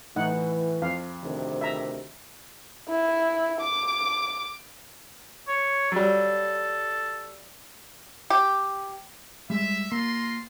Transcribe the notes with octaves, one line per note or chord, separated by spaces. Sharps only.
A2 E3 D#4 F#5
F2 F5
D2 C3 D#3
E5 A#5
E4
D6
C#5
F#3 G3 A4
G4
G3 G#3 E5
A#3 F4 A#5 C6